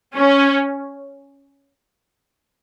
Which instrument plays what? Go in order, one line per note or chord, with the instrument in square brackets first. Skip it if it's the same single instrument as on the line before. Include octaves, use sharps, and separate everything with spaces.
[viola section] C#4